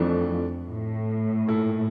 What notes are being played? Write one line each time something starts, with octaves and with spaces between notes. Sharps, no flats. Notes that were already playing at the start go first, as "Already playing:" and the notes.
Already playing: F2 E3 A3 D4
A2
A#2 A3 E4 A4